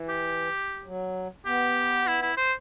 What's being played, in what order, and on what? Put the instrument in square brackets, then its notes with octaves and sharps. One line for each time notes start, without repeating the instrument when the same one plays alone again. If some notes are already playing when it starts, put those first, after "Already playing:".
Already playing: [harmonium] E3
[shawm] G4
[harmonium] F#3
[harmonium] B3 [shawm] G4
[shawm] E4
E4
C5